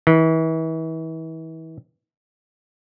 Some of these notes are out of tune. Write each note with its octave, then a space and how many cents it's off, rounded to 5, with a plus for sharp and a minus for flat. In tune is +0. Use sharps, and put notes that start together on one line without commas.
E3 -35